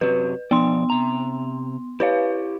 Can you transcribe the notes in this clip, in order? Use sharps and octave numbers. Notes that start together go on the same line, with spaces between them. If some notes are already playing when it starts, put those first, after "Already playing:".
F#2 C3 F#3 B4
B2 F3 B3 D5 C6
C3 A#5
E4 G4 B4 C#5 F5